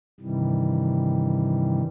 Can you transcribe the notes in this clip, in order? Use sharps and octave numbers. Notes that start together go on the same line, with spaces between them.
G2 C3 D#3 E3 G3